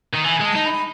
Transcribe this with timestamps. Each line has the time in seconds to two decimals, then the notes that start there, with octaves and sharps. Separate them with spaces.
0.14 D#3
0.25 E3 G#5
0.41 G#3 A5
0.55 D#4
0.66 B5